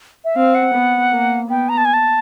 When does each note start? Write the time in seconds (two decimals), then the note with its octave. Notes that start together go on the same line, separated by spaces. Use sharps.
0.25 E5
0.36 C4 F5
0.55 F#5
0.74 B3
1.12 A#3
1.50 B3 G5
1.69 A#5
1.78 A5
1.85 G#5
1.94 A5